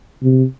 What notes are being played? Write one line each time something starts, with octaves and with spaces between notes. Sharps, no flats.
C3